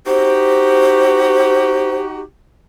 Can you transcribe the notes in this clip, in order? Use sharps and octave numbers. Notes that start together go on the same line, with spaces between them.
D#4 F#4 G4 C5